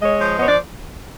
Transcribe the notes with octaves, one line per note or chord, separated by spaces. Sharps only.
G#3 C#5 D#5
F3
B3 C#5 D#5
D5